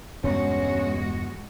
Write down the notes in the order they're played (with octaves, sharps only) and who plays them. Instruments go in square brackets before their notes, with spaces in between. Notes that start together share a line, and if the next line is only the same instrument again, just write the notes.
[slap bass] E2 G2 B2 [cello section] G#3 F#4 [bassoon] C#4